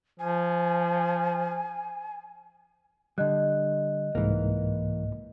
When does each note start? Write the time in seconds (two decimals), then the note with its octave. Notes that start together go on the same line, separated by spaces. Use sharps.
0.19 F3 G#5
3.18 D3 G3 D#5 F#6
4.15 C2 G#2 E3 A#3